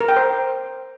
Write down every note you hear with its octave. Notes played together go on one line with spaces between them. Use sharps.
A#4
G5
C5